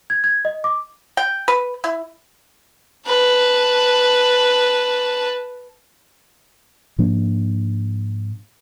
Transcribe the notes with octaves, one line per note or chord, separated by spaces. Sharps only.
G#6
G#6
D#5
D6
G5
B4
E4
B4 A5
G#2 F3 A#3 D4